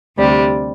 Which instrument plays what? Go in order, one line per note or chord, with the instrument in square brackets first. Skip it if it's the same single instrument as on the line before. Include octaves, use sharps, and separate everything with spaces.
[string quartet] D2 C3 G3